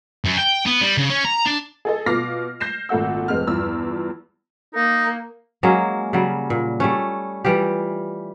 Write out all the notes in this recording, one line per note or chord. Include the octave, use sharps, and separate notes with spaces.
F#2
G5
B3
G3
C#3
C#4
A#5
D4
G#4 A4 D#5
B2 F4 D6 F6 A#6 C7
G6 A#6 C7 E7
G#1 A#2 A3 F#5 E6
F1 G#3 C4 F6
E2 G2 F3 E6
A#3 D#4
F#3 G#3 A#3 C#4
C#3 F#3 G3
A#2
G3 A3 C#4
E3 G3 F4 G4